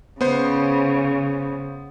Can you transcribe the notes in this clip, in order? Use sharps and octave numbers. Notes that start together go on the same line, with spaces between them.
C#3 B3 C5